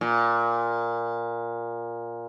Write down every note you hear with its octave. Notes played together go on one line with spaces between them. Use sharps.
A#2